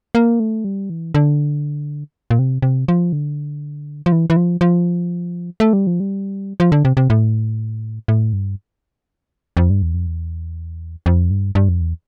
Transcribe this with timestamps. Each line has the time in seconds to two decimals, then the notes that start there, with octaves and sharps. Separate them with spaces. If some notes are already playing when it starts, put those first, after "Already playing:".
0.15 A#3
0.40 A3
0.64 G3
0.90 E3
1.14 D3
2.30 A#2
2.39 C3
2.62 C3
2.88 F3
3.13 D3
4.06 F3
4.12 E3
4.30 E3
4.37 F3
4.61 F3
5.60 A3
5.73 G3
5.87 F3
6.00 G3
6.60 F3
6.72 D3
6.85 C3
6.97 C3
7.10 A2
8.08 A2
8.33 G2
9.57 F2
9.70 G2
9.82 E2
9.94 F2
10.07 E2
11.06 F2
11.31 G2
11.55 G2
11.69 F2
11.81 E2